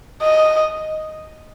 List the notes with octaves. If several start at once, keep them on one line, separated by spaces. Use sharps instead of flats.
D#5